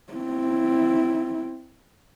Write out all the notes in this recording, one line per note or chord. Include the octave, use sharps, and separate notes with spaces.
C4 E4